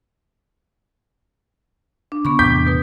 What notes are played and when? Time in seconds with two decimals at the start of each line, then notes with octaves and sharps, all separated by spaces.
2.12 D4
2.25 D3 B3 B5 C#6
2.39 E2 A2 C3 G5 D6 G6 B6
2.67 B2 B4